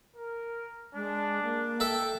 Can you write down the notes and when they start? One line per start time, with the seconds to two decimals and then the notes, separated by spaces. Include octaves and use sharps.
0.16 A#4
0.95 G#3 D4
1.43 A#3
1.80 A4 E5 G5